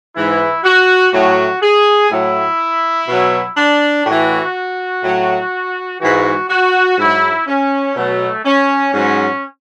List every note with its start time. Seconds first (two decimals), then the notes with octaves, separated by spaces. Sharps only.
0.15 G#2 E3 E4
0.64 F#4
1.13 A2 F#3 F#4
1.62 G#4
2.10 A2 F#3 E4
3.08 B2 F#3
3.56 D4
4.06 A2 E3 F#4
5.04 A2 F#3
6.00 G#2 E3 F#4
6.49 F#4
6.98 G#2 F#3 E4
7.47 C#4
7.95 B2 F#3 A3
8.45 C#4
8.93 G#2 F#3 C#4